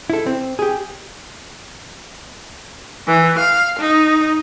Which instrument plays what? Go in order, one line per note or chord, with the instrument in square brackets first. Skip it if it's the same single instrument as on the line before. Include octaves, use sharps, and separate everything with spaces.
[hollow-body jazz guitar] E4 A4
C4
G4 G#4
[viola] E3
F5
D#4